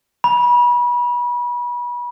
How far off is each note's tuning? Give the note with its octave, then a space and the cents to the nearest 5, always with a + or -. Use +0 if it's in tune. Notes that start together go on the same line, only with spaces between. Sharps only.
B5 -30